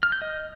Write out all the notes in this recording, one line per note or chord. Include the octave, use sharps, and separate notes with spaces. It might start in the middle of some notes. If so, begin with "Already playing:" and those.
F6
G6
D#5